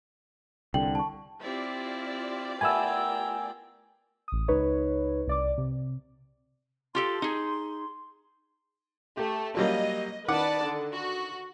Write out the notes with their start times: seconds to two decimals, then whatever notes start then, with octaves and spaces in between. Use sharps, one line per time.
0.74 C2 D3 G5 F#7
0.95 A5 C#6
1.42 C4 E4 F4 G4 D5
2.61 A3 B3 E4 A#4 G5 G#5 E6
4.28 A1 D#6
4.48 C#2 D#4 B4 C#5
5.27 C2 D5 D6
5.58 C3
6.95 F4 G4 A4 C6
7.22 D#4 G#4
9.17 A3 G4
9.57 F#3 G3 A#3 D#5
10.28 D#3 B4 D5 F#5 A5 D6
10.63 D3
10.94 F#4